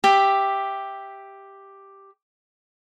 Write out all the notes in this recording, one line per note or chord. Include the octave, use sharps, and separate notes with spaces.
G4 E5